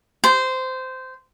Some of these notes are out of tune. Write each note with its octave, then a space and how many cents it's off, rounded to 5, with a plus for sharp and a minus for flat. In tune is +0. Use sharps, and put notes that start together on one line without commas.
C5 -15